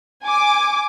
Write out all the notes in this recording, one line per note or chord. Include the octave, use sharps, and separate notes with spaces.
G#5 D6